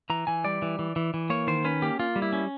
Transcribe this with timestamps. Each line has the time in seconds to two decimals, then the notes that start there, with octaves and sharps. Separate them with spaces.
0.10 E3 A#5
0.27 E3 G#5
0.44 G3 D5
0.62 E3
0.79 E3
0.96 E3
1.14 E3
1.30 A#3 C#5
1.47 D#3 C5
1.65 C#4 B4
1.82 A#3 G4
1.99 A#3 F4
2.16 G3
2.22 E4
2.33 C#4